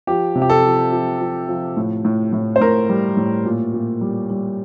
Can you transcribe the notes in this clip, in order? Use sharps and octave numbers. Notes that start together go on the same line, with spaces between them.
F3 G4
C3
G4
A4
F3
F3
F3
F3
A2
A2
A2
C5
A2 A#4
G3
A2
A#2
A#2
G3
G3